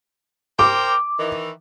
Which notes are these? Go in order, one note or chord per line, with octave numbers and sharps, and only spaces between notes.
A#4 C5 G5 D6
D#3 E3